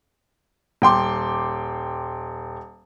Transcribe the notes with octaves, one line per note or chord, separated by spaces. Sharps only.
D#1 G5 C6 D6